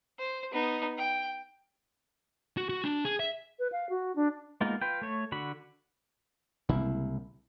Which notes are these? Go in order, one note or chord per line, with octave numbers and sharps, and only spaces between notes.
C5
B3 D#4
G5
F#4
F#4
D4
G#4
E5
B4
F5
F#4
D4
G#3 A#3 B3 D#4 F4
F4 B4 G5
A3 C#5
D3 F#4 B5
C2 C#3 G#3 A#3 E4